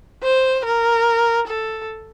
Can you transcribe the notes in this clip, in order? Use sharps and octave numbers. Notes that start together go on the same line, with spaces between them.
C5
A#4
A4